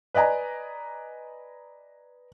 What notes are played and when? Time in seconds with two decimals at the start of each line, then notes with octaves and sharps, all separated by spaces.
0.14 B4 D5 D#5 G#5 A#5